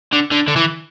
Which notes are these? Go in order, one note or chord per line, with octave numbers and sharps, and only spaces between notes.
D3
D3
D3
E3